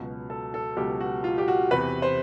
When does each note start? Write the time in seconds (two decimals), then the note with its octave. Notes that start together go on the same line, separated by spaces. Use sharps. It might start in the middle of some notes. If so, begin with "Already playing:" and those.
Already playing: C#2 B2 F#3
0.30 A4
0.54 A4
0.77 C#2 B2 F#3 G4
1.01 F#4
1.24 F4
1.38 G4
1.48 F#4
1.71 E2 C3 E3 B4
2.02 C5